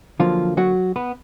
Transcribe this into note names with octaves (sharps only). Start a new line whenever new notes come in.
D3 F3 F#3 A#3 F4
F#3 F#4
B3 B4